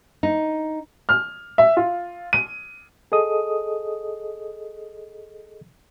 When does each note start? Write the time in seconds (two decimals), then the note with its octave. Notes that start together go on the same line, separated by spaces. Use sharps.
0.23 D#4
1.09 F6
1.58 E5
1.77 F4
2.33 D#7
3.12 G#4 A4 D#5 D#6